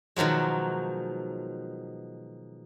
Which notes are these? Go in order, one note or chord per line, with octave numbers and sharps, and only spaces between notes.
B2 D#3 F3 F#3 G#3